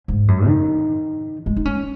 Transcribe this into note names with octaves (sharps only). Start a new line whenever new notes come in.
G#2
F#2
D#3
G#3
D#4
C#4